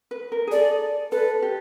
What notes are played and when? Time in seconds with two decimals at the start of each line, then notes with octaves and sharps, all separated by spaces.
0.11 B4
0.32 A#4
0.47 G#4
0.51 A4 D5
1.12 A4 B4
1.42 G4